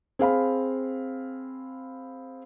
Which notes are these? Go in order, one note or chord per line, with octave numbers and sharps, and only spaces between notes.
C4 G#4 F5 B5